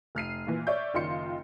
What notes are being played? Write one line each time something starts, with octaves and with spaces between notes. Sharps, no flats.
F1 F6 C7 D#7
A#2 E3
C#5 D5 E5 C#6 G6
F#1 D#3 F4 C6 C#7